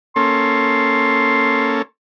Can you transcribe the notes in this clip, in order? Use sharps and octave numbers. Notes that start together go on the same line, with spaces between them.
A#3 C#4 A4 C6